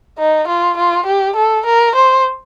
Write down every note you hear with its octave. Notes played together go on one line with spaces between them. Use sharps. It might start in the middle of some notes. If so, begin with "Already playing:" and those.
D#4
F4
F4
G4
A4
A#4
C5